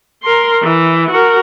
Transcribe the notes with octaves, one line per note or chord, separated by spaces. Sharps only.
A#4 C6
E3
F#4 A#4